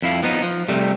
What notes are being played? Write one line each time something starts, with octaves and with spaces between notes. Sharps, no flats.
F2 E4 F5
F3 B3 D#4
F3
C3 G3 A3